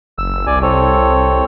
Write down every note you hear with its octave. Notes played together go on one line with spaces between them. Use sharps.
F#1 E6
C2 D5 G#5
C4 A4 C#5